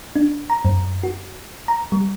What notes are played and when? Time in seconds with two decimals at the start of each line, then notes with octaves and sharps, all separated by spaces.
0.16 D4
0.50 A#5
0.65 F#2
1.03 F#4
1.68 A#5
1.92 G3